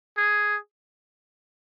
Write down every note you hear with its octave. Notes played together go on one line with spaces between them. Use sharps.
G#4